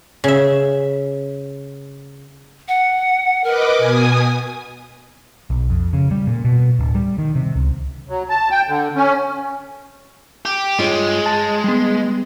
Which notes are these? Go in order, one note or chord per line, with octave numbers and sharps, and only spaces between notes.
C#3 E5
F#5
A#4 B4 D#5 D6
B2 G#5 D#6
B1
F2
C#3
G3
A#2
B2
D1
G3
D#3
C3
C#2
F#3
A5
G5
D3
C#4
G4
G2 G#3 F4 C#5
A5
G3 B3